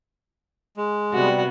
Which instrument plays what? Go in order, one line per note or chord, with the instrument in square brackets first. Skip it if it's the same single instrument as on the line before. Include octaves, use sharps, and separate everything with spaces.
[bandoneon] G#3
[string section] C3 B3 [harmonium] G3 [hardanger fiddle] F#4